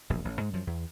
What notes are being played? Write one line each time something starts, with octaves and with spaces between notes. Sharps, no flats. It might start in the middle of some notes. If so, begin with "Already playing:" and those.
E1 A#1 F#2
A1
G#2 G#3
F#2 F3
E2